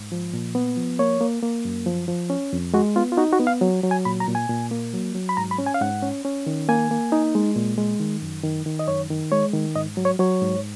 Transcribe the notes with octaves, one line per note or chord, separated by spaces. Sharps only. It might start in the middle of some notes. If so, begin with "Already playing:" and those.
Already playing: G#2
F3
A#2
B3
F3
A#3 C#5
A#3
A#3
F#2
F3
F3
C#4
F2
G#3 F#4
B3 F4
F4
D#4 F#4
F#4
B3
F5
F#3
F#3
G#5
A#2 B5
A#5
A#2
G#5
A#2
A#3
F#3
F#3
B5
G#2 A#5
B5
C#4
G#5
F5
G#2 F#5
C#4
C#4
D#3
A#3 G#5
A#3
D#4
G#3
A#2
G#3
D#3
F#2
D#3
D#3
D#5
F#2 C#5
D#3
G#3 C#5
D#3
G#2 D#5
F#3
C#5
F#3 C#5
G#2